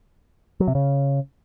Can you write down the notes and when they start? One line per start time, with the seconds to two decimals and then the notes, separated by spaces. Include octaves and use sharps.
0.60 F#3
0.68 C3
0.75 C#3